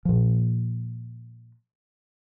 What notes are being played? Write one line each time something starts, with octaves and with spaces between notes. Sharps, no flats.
A#2 F3